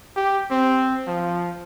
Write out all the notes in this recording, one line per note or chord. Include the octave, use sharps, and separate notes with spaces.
G4
C4
F3